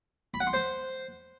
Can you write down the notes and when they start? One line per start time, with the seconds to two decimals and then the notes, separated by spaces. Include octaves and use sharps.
0.34 B5
0.40 F#5
0.47 C6
0.53 C5